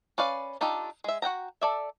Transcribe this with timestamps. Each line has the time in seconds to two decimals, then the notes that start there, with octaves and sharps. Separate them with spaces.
0.18 C#4 B4 D5 F5
0.61 D4 D#4 F4 G4 A4
1.04 G#3 E5
1.22 F#4 F#5 G5 A#5
1.61 A4 D5 E5